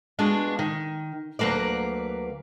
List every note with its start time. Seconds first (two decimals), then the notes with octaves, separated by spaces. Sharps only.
0.19 G#3 B3 D4 F4 F#4
0.59 D#3
1.39 D2 F#3 A#3 B4 D5